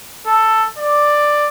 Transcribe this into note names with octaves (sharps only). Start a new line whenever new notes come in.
A4
D5